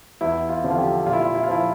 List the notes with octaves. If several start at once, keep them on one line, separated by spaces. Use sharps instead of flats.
E2 E4
F4
D3 F3
F4
G4
A#2 F4
E4
F4
E4
F4
F3 E4